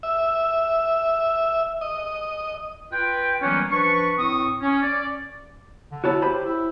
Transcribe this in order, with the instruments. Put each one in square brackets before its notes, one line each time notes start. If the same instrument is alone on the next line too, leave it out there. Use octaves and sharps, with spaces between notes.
[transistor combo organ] E5
D#5
[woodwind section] F4 B4 G5
E3 F#3 G3 A#3 B3 C#4
F3 D4 B4 C#6
A2 C4 C#6 D#6
C#4
D5
[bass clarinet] D3
[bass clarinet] E4 [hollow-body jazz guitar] F#4 C#5 A5
[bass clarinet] G4 [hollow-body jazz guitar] C5 B5
[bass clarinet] E4